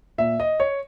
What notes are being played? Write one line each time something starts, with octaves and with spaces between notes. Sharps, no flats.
A#2 E5
D#5
C#5